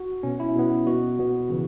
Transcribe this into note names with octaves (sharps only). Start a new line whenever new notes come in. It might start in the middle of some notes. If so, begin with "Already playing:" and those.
Already playing: F#4
B2 B3 C#4
E4
B2 B3
B2 B3 F#4
B2 B3
C#3 E3